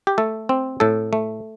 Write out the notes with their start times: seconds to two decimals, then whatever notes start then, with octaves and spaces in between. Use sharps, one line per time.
0.07 G4
0.18 A3 A4
0.49 C4
0.80 A2 A4
1.13 A3